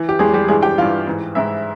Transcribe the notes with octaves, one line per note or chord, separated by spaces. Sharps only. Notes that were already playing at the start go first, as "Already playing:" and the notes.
Already playing: E3
G4
E2 E3 G#3 G#4
G3 G4
G2 E3 G#3 G#4
G4 G5
G2 E3 F4 F5
G#2 E3
G#2 E3 E4 E5